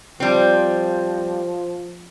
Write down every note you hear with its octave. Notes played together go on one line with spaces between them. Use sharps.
F3 G3 C4